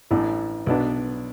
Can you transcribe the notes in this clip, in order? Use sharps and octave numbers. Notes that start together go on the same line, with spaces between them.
A1 A2 E3 D4
B1 B2 B3 D4